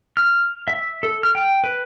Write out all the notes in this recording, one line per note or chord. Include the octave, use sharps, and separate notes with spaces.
F6
E5
A4
F6
G5
B4